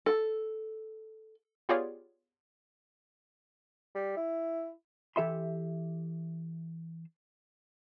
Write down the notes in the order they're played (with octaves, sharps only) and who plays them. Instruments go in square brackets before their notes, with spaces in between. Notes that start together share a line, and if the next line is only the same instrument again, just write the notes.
[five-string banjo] A4
[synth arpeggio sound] B3 F4 G4 G#4 C#5 D5
[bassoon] G3
E4
[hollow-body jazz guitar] E3 G4 A4 E5 B5 C6